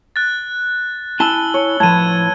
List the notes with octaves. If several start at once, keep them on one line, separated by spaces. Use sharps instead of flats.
F#6 A6
E4 G#5 A5 E6 G7
C#5
A2 F3 B4 A5 G#6 D#7